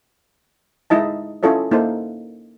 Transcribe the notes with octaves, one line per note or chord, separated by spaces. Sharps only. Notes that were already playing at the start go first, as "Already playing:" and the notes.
G#3 D#4 E4 D#5 A5
C#4 E4 F4 A4 C#5 D#5
A#3 D#4 E4 A4 C5